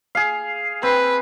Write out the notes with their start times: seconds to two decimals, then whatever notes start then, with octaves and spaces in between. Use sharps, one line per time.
0.15 G#4 F5
0.83 C4 B4